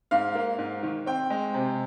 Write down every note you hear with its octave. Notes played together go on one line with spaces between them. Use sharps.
G#2 F5
A#3
G#2
D#3
C4 G5
G#3
C3